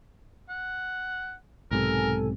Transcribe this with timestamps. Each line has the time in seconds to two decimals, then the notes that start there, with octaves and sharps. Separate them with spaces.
0.49 F#5
1.71 B1 G#2 C3 A4 A#4 G#5